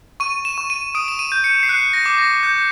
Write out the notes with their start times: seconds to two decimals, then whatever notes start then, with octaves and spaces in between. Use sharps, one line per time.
0.20 C#6 D#7
0.45 E7
0.58 C#6
0.70 D#7
0.95 D#6 D7
1.08 E7
1.19 D#7
1.32 G6
1.44 C#7
1.63 C7
1.69 F#6 C#7
1.93 A#6
2.06 D6
2.18 A#6
2.43 G6